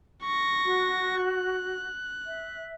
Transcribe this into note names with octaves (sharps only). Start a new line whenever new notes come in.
C#6 A#6
F#4
F#6
E5